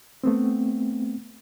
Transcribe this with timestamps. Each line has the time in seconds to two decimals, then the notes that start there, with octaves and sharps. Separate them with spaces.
0.24 A3 B3 C4